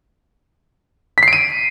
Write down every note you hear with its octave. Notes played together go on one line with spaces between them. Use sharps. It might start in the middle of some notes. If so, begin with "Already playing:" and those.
B6
C7
D7
D#7